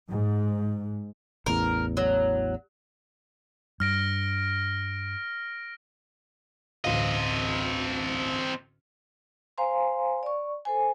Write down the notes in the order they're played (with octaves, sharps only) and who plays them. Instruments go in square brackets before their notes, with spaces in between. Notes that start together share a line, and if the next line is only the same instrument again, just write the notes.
[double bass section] G#2
[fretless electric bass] A1 E2 [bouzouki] A#4
[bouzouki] F#3
[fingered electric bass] G2 [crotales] F6 A#6 D7
[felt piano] A1 D2 F5 [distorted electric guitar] C4 D#5
[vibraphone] C5 F5 G#5 A#5 C6
D5 C#6
A4 C5 G#5